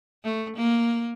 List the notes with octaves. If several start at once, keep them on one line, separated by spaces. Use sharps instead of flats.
A3
A#3